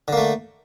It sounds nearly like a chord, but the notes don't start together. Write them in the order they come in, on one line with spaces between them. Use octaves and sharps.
D3 A#3 A3